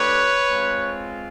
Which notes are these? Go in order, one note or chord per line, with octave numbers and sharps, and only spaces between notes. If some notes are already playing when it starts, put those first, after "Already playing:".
Already playing: A3 D4 G4 B4 C#5
G#3 C4 F4